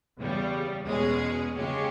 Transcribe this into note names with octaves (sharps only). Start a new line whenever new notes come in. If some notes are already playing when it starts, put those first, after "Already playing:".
E2 C#3 G3
E2 B2 G#3 C#4 G#4
C#3 G#3 C#4 G4